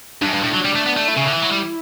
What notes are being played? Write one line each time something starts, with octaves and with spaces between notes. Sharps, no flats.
G2 D4
F#2
G2
A2
F#3
G3
A3
B3
A3
E4
C#3
D3
E3
F#3
G3